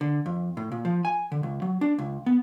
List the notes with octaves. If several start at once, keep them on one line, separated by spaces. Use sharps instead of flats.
D3
F2
A2
A#2
F3
G#5
D3
C#2
F#3
D4
C#2
B3